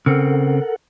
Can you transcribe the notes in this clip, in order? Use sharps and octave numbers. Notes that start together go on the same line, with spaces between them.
C#3 C4 A4 A#4 F#5